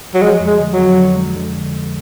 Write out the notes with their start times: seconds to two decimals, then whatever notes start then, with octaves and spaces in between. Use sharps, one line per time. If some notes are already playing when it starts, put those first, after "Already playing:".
0.14 F#3
0.22 F3 G#3
0.40 F2
0.47 G#3
0.60 D3
0.73 F#3
0.78 F2
0.98 D3
1.17 G#3
1.35 D3